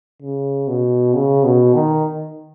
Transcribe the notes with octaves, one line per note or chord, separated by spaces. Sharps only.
C#3
B2
C#3
B2
D#3